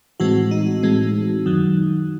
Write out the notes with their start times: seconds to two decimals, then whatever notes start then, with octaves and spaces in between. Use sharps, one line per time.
0.20 A2 E3 G#3 C4 F#4
0.51 D#4
0.83 A2 E3 G#3 C4
1.46 F#2 D#3 F#3